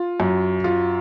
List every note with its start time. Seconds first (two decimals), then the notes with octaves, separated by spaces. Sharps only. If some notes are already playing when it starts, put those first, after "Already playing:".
Already playing: F4
0.20 F#2
0.64 F4